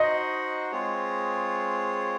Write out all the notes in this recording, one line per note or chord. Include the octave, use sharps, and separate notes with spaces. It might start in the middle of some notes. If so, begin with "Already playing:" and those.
Already playing: D#4 F#4 C5 D#5 F#5
G#3 C4 F4 G#4 C#5